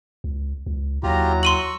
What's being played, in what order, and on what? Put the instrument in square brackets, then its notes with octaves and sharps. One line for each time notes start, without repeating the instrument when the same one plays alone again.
[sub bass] C#2
C#2
[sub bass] D#2 [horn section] F#3 E4 A#5 [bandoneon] F4 G4
[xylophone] C6 D#7 F#7 [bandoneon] C#6 E6